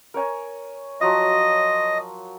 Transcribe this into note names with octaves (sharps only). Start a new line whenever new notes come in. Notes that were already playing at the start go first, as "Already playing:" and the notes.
A#4 C#5 G#5
F3 F#3 F4 D#5